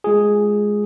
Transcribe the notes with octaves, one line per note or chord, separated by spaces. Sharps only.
G#3 F4 G#4